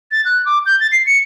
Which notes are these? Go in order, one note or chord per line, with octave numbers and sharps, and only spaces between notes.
A6
F#6
D6
G6
A6
C7
C#7